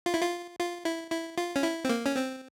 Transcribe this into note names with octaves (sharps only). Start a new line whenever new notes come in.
F4
E4
F4
F4
E4
E4
F4
C#4
E4
C4
A#3
C#4
C4